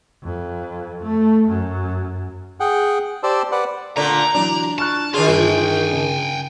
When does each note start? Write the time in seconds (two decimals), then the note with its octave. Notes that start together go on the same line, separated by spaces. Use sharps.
0.23 F2
1.04 A3
1.49 F#2
2.60 G#4 F#5 G5
3.23 G4 C5 D5 A5 E6
3.52 B4 D5 F#5
3.97 A#2 D3 A3 A#5
4.35 E3 F#3 D4
4.78 A5 C#6 F6 F#6
5.14 D#3 D4 F4 G#4
5.27 G1 F4 G5 G#5
5.92 C#3